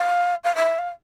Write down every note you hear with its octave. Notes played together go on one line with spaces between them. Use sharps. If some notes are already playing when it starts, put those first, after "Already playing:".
Already playing: F5
F5
E5
F5